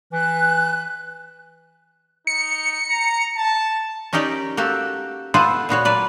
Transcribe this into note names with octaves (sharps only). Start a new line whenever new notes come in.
E3 F#6
D#4 C#7
A#5
A5
C#4 D#4 G4 A#4 D5 G5
A#3 F#4 G4 A4
B3 F4 A4 C5 F#5 G#5
A#2 B3 F#4 C#5
F#3 B4 D5